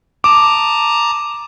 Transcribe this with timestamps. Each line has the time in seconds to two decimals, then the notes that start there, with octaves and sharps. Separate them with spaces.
0.24 A5 A#5 D6 D#6